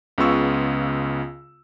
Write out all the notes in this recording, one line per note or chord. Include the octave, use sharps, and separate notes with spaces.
C#2 C#3 B3 F4 C#6 E6